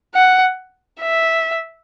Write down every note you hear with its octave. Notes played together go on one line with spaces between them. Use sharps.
F#5
E5